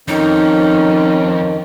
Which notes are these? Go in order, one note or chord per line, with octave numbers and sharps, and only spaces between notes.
F2 D#3 C#4 D#4